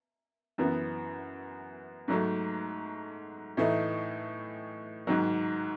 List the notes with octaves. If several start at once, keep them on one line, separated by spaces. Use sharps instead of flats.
F#2 E3 B3
G#2 F#3 A3
A2 E3 A3 D#4
G#2 D#3 F#3